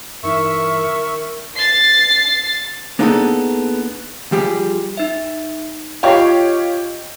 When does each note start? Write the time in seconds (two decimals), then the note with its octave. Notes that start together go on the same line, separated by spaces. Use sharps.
0.23 G2 E3 D#4 A#4 E5 C#6
0.86 D#3
1.56 A6 C7
2.99 A#3 B3 D4 D#4 G#4 A4
4.32 F3 G3 G4 G#4
4.97 D#4 E5
6.03 F4 G4 C#5 D#5 F5 C7